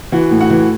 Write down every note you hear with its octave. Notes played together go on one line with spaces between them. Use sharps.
E3 F#4 F#5
A2
F#4 F#5
E3